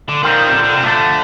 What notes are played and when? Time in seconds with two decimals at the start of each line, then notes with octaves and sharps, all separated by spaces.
0.09 D3
0.23 A#2 D#3 G3 C4 F4
0.48 C3
0.54 D3
0.64 D3
0.74 C3
0.83 G2 D3 F3 A3 D4